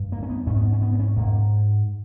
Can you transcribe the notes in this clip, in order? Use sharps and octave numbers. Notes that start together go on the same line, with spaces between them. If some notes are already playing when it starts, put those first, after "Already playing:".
Already playing: G2
A#3
C#4
B3
G#2 C#4
B3
C#4
B3
B3
C#4
G#2 A#3